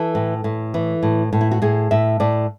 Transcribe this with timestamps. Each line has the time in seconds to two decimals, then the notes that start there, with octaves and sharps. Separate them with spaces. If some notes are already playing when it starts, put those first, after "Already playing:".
Already playing: E3 A4
0.15 A2
0.44 A2
0.74 E3
1.03 A2
1.33 A2
1.41 E4
1.51 F#4
1.62 A2 G#4
1.91 A2 E5
2.20 A2 D5